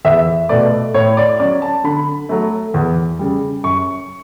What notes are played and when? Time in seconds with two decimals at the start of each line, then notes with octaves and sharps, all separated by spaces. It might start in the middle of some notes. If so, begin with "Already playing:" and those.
0.05 E2 E5
0.49 B2 A3 D5
0.94 A2 C#5
1.17 D5
1.40 F#3 C#4 D5
1.62 A5
1.84 D3 B5
2.29 F#3 A3
2.74 E2
3.19 C#3 G3
3.63 F#2 C#6